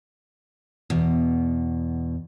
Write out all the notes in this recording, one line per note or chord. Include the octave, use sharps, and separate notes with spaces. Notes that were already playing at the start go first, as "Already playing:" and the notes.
E2 B2